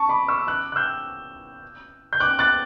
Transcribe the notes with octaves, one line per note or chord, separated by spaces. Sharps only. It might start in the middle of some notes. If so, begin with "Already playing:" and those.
Already playing: A5 C#6
B5 D6
C#6 E6
D6 F#6
F#6
E6 G6
G6
D6 F#6
F#6 A6